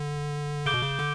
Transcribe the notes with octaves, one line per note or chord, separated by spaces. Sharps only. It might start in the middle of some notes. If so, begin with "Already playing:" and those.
Already playing: D3
C#3 D6 G6 D7 G7
B2
C#3
D3